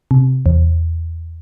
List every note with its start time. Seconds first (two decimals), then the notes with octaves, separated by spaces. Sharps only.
0.11 C3
0.46 E2